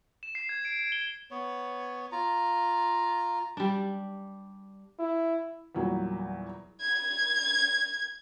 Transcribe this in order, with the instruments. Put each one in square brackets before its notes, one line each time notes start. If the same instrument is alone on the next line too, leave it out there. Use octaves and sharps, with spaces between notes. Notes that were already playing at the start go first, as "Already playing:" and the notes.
[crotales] E7
C7
G#6
D7
D7
G7
[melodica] B3 C#5
F4 A#5
[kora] G3 D4
[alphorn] E4
[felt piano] E2 A#2 F#3 G3 A#3
[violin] G#6